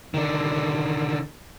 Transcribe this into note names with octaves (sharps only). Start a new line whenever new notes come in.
D3 D#3